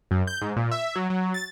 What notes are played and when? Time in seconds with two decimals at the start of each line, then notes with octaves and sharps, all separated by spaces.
0.11 F#2
0.27 G6
0.42 G#2
0.56 A#2
0.71 E5
0.96 F#3
1.10 F#3
1.34 A6